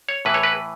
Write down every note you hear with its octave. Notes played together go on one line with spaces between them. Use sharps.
C#5
A2 E3 B4
C#5
B4